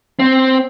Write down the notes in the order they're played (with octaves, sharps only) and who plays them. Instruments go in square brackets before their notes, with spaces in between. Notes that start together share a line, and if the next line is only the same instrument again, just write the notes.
[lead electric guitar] C4